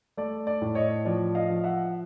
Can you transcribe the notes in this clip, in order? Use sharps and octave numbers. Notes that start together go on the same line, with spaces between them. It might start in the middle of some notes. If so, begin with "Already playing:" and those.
A3 D5
D5
A2
C#5 D#5
F3 D5
D#5 F5
F3
E5 F#5